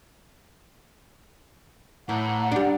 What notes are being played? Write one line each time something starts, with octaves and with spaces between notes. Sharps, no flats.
A2 E3 F#5 A#5
G3 D4